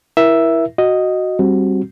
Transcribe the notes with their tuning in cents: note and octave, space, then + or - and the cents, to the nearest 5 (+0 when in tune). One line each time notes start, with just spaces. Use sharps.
E4 +0 A#4 +35 E5 +0
F#4 +0 D#5 +0
G3 +0 C4 +25 F#4 +0